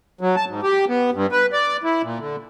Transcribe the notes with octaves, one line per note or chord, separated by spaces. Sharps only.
F#3
A5
G#2
G4
B3
G2
B4
D5
E4
A#2
D3